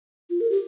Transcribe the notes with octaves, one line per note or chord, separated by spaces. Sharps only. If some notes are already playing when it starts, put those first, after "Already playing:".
F4
A#4
G4